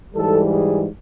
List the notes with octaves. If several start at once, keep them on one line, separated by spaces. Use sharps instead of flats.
G#2 E3 G3 A4
G#4